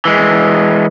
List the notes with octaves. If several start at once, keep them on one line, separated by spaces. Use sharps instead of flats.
E3 G#3